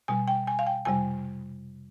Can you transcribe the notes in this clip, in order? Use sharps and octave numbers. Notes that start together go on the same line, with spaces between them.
B2 G3 G#5
G5
G#5
F5
G5
F2 C3 G3 G#5